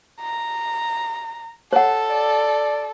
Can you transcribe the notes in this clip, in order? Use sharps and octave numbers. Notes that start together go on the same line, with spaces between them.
A#5
A4 C#5 F#5
D5